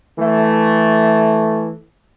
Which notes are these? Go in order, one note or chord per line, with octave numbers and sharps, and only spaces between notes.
E3 A3